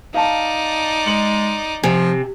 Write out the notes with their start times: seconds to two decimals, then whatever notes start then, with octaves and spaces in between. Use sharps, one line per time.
0.14 D#4 D5 F5 A5
1.06 G#3 C#7 F#7
1.83 C3 F3 G#5